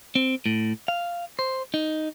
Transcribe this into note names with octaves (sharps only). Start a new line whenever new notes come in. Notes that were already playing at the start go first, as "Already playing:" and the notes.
C4
A2
F5
C5
D#4